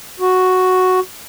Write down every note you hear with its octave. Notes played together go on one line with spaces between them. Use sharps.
F#4